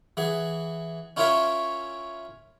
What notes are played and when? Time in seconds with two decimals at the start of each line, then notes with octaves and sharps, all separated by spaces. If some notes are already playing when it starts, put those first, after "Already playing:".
0.17 E3 G#4 F#5
1.17 C#4 E4 F4 A#4 C#5 E5